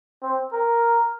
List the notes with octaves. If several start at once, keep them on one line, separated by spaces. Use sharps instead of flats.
C4
A#4